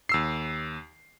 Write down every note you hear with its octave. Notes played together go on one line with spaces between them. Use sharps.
D#2 E6 C7